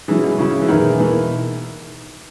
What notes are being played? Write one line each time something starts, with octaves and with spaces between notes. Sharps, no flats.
E3 F#3 C#4 E4 G#4
B2
C#3 F#3 C#4 E4 G#4
E3
E2 B2 D#3 A#3 E4 G#4
B2 E3 A#3 E4